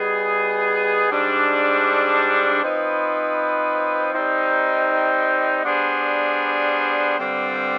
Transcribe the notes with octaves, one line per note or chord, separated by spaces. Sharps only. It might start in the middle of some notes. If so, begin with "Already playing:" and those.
Already playing: G3 B3 D#4 G#4
G#2 G3 D4
F3 C4 D#4 B4
G3 C4 D#4
G3 B3 D4 G#4 C5
G2 D3 G3 C4